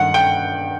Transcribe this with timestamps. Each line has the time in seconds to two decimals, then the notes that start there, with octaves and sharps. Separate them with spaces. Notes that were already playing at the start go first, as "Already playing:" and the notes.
Already playing: G2 D#3 F#5
0.14 G5